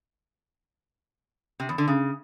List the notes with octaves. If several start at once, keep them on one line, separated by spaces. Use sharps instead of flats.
C3
E2
D3
C#3